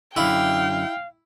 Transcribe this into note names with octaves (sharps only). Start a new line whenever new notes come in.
F#2 D3 E4 F5 G5